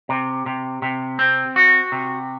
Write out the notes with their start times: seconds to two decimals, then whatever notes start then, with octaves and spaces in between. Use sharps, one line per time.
0.09 C3
0.46 C3
0.82 C3
1.19 C4
1.56 F#4
1.92 C3